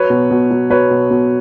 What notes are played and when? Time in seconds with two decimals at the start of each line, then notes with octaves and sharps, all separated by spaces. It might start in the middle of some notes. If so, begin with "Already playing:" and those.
Already playing: F#3 B4 C#5
0.10 B2
0.31 B2
0.51 F#3
0.70 F#3 B4 C#5
0.91 B2
1.11 B2